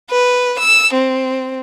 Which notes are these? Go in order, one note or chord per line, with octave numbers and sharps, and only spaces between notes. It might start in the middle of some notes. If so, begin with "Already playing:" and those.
B4
E6
C4